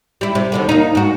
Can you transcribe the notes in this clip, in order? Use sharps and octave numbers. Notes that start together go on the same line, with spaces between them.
G3 E4
C3
D#2 B2 D3
A#3 D#4
G#2 F#4